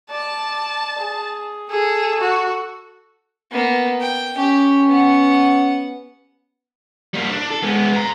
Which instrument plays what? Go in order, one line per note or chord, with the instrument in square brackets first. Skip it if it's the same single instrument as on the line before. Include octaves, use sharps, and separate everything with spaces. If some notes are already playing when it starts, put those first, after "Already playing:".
[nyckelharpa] D5 [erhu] A5
[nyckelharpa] G#4
[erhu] G#4 [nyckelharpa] A4
[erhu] F#4
[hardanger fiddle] A#3 B3
G5
[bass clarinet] C#4 [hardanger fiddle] G4
[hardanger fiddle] B3 F#5
[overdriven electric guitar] G3 A#3
D4
A4
G#3 B3
A#5 C6